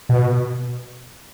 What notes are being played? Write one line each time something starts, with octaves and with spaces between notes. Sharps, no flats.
B2